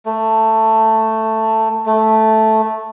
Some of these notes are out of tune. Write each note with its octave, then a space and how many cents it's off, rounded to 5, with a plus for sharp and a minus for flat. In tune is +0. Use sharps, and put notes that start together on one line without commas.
A3 +10
A3 -5